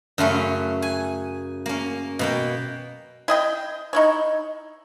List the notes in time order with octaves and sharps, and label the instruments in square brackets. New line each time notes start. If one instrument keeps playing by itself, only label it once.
[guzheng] F#2 C#3 A3 C#4
G#5
A#3 C#4
B2 A#3 G5
[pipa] E4 D#5 G5
D#4 E4 C#5